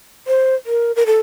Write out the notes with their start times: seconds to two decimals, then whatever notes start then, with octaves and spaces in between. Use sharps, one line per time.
0.27 C5
0.66 A#4
0.96 A#4
1.06 A4